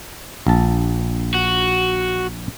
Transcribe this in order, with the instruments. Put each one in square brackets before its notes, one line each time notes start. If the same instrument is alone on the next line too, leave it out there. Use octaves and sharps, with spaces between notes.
[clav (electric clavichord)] A#1 A5
[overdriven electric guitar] F#4